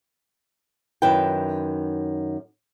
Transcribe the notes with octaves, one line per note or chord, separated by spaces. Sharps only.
F#2 D#3 E4 B4 G5